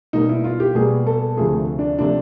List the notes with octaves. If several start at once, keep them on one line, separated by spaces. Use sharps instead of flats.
B2 G3 A#3 D#4
E4
F4
G4
B2 G3 A#3 G#4
A4
D2 C3 F3 A3 G#4
D4
C3 F3 A3 D4